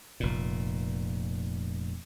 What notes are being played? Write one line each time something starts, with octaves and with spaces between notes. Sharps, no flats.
F1 A#2